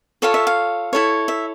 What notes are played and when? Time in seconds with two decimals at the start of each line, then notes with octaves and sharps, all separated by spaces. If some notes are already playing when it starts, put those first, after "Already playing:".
0.22 F4 A4 C#5 F5
0.34 E5
0.47 F5
0.93 E4 A4 C#5
1.28 E5